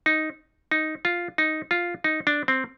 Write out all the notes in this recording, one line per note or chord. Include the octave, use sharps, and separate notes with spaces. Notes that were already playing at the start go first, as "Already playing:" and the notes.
D#4
D#4
F4
D#4
F4
D#4
D4
C4